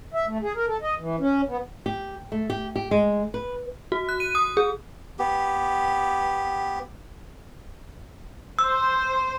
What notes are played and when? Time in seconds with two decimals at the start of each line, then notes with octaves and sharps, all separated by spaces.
0.14 E5
0.27 A3
0.42 G#4
0.55 A#4
0.68 A4
0.82 D#5
0.99 E3
1.20 C#4
1.48 B3
1.86 G4
2.32 A3
2.50 G4
2.76 G4
2.91 G#3
3.34 B4
3.92 F#4
4.09 F#6
4.20 D#7
4.35 D#6
4.57 G#4
5.19 B3 G4
8.59 C5 E6